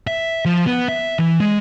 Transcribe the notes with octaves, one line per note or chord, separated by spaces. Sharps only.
E5
F3
B3
E5
E3
G#3